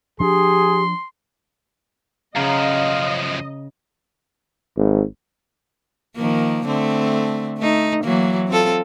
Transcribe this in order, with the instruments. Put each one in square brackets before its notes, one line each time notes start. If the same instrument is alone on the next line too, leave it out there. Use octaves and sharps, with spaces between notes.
[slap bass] F3 D4 [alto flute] G4 [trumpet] G#4 [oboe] C6
[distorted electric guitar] F#2 F3 [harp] C#3 A#5 [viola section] D#5 [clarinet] F5
[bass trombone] G#1
[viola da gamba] D#3 F3 A#3
D3 A3 C4
A3 D#4
E3 F#3 A#3
C4 F4 A4